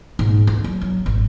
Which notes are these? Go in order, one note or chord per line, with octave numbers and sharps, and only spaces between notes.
G#2
D2
F#3
F#3
G#1